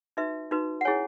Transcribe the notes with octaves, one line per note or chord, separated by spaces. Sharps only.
D#4 F#4 B4 E5
D#4 F#4 B4
F#5
C#4 E4 G#4 C#5 G#5